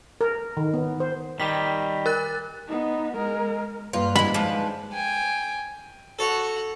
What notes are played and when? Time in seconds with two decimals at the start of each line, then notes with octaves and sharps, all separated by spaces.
0.21 A#4
0.57 D#3
0.74 B3
1.00 C5
1.40 D#3 G3 B6
2.06 A#4 F#6 A6
2.67 B3 D#4
3.16 G#3 A#4
3.93 G2 A#3 F4 B4
4.16 G#2 G3 B3 E4 B5
4.34 F3 G#3 D4 D#4 B4
4.93 G5 G#5
6.19 F#4 A4 C#5 F#5